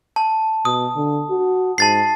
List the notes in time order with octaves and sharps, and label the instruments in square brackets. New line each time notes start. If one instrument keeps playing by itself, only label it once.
[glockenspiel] A5
[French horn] B2 [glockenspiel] D#6
[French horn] D3
F#4
[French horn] G#2 [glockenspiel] A5 A6 C7